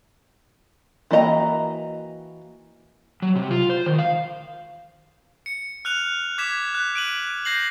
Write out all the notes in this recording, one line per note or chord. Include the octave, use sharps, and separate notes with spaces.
E3 A#3 F#4 D#5 A#5
F#3
C3
F4
C5
D#3
F5
C#7
F6 F#6 F7
D6 G#6 B6 E7
F#6
D7 D#7 F#7
G6 A#6 C7 F#7